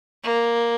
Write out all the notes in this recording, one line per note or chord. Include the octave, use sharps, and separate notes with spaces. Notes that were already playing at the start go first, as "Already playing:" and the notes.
A#3